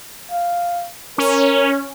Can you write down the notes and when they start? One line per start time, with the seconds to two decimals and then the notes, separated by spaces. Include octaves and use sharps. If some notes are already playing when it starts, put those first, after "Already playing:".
0.31 F5
1.18 C#4 A#4